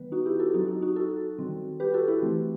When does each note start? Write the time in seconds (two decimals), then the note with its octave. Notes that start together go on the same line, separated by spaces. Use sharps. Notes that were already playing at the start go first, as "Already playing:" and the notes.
Already playing: D#3 G3 B3 B4
0.12 D#4 F#4
0.26 E4 G4
0.39 F#4 A4
0.54 F#3 C4 D#4 F#4
0.68 D#4
0.82 D#4 F#4
0.96 F#4 A4
1.39 D#3 G3 C4
1.80 G4 B4
1.94 F#4 A4
2.08 E4 G4
2.22 E3 A3 C4